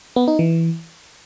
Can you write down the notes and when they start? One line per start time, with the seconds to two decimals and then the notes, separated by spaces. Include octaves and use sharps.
0.16 B3
0.28 D#4
0.39 E3